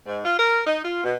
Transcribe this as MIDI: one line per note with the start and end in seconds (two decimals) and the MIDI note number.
0.07 0.20 44
0.25 0.37 65
0.38 0.61 70
0.67 0.81 63
0.84 1.01 65
1.04 1.16 47